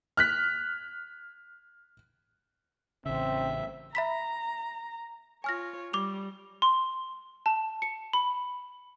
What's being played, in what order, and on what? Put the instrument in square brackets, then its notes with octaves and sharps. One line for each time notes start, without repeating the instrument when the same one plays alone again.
[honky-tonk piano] F6 F#6 B6
[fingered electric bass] A1 C#3 [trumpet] C4 [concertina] E5
[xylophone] E5 B5 B6 [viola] A#5
[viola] F4 C#5 [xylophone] G#5 F6 A#6
[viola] G3 [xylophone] D6 F7
[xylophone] C6
A5
C#7
B5